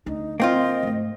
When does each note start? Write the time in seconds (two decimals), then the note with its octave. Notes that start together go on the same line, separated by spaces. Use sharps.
0.06 D2 D3 D#4
0.40 A#3 C4 F4 D#5
0.83 G#2 A3